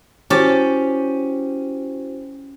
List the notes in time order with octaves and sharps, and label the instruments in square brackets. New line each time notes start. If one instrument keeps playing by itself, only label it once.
[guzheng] C#4 G4 A5 [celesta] E4 F#4 C5